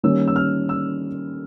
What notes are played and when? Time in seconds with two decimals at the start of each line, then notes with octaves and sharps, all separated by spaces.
0.03 D#3 G3 A#3 C#4 E6
0.28 E6
0.36 F6
0.69 E6